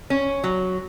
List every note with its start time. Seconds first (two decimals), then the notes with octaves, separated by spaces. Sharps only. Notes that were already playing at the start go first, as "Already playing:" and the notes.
0.10 C#4
0.44 F#3